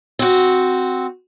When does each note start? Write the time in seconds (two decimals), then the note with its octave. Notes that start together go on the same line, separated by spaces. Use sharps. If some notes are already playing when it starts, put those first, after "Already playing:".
0.19 C4 F#4